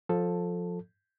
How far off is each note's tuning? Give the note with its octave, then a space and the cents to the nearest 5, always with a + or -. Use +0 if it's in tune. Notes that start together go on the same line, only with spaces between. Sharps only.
F3 +20 A4 +0